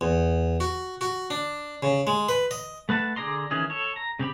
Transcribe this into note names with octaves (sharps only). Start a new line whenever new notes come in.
E2
F#4
F#4
D4
C#3
G#3
B4
D#5
A3 B4 F#5 A5
D3 G#4 D5 A#5 C6
D#3 E3 C#4 G#4
A4 C#5
A#5
C#3 C4 G4 B5